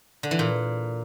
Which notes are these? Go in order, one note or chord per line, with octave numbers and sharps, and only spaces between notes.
D3
E3
A#2